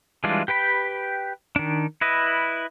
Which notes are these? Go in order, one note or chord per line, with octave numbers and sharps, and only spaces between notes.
E3 G3 G#3 D4 F4
G4 B4 G5 B5
D#3 D4
E4 B4 D#5